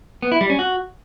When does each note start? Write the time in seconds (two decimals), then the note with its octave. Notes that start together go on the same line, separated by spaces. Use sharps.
0.22 B3
0.32 E4
0.41 G3
0.50 C#4
0.59 F#4